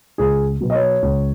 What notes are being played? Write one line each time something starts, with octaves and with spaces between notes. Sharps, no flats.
C#2 G#4
B2 F#3
D#5
C#5
C#2